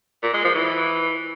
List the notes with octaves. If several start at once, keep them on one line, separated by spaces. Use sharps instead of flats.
A#2
G#3
F3
E3